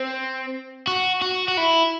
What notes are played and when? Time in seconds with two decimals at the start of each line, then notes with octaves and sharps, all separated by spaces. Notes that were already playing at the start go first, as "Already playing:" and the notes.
Already playing: C4
0.87 F#4
1.22 F#4
1.48 F#4
1.58 E4